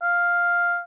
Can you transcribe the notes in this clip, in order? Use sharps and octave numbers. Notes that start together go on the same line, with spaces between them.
F5